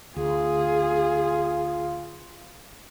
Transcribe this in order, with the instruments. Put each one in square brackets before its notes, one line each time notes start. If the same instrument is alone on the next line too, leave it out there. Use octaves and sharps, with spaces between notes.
[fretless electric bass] D2 [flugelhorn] F4 [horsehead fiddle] G#4